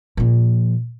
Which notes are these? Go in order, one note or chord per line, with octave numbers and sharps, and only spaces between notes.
A#2 F3